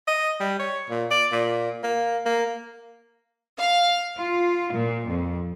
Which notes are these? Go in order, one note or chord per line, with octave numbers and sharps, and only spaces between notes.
D#5
G3
C#5
A#2
D5
A#2
A#3
A#3
F5
F4
A#2
F2